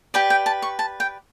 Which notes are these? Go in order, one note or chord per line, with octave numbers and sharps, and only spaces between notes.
G4 B4 D5 G5
G5
A5
C#6
A5
G5